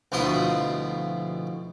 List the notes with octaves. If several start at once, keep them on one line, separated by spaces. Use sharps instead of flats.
D2 B2 F3 E4 C6 D#6